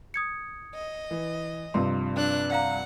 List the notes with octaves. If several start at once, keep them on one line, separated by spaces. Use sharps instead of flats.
D#6 G#6 C#7
D#5
E3
G2 C3 F3 C6
D4 F#6
D5 F5 F#5 A#5